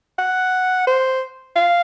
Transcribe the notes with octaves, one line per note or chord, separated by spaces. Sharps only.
F#5
C5
F5